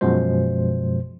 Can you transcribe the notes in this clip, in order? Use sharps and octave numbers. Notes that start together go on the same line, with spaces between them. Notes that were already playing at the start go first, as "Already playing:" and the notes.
F#2 B2 F3 G#3 C5